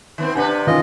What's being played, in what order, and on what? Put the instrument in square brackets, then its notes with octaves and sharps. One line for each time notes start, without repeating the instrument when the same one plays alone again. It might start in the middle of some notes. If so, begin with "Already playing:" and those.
[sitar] D#3 B3 C4
[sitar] C3 D4 B4 [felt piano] F#5 G#5
[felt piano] D#3 E3 C#4 [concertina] F4 D#5